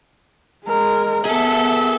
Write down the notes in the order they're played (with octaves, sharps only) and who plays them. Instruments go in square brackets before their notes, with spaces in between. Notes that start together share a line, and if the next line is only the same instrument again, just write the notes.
[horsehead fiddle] G#3 A#4
[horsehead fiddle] B3 E5 [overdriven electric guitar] G#4 A4